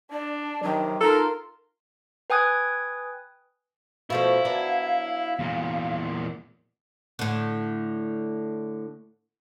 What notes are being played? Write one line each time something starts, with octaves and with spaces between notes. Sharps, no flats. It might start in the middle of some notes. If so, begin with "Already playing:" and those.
D4 D5
C3 D#3 F#3
D#4 F4 A4 A#4 C6
B4 G5 G#5 D#6 F#6 G#6
B2 F3 A3 E4 F5
F#3 B3 D4
E2 A#2
A2 D3